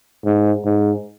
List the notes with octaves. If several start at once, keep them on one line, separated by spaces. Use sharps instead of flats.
G#2
G#2